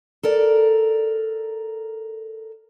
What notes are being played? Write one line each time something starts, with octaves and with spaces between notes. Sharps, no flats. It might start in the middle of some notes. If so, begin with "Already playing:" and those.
A4 A#4 D5